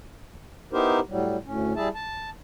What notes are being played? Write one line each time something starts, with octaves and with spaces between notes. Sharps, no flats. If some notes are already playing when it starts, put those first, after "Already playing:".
B3 D#4 E4 G4 A#4 C5
A2 F#3 G3
D2 A2 C#4
G3 E4 G#4 E5 A5
A5